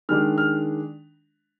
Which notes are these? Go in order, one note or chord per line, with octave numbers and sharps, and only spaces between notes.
D#3 G#3 D4 F6
F6